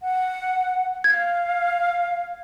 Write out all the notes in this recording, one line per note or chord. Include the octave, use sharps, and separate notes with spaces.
F#5
F5 G#6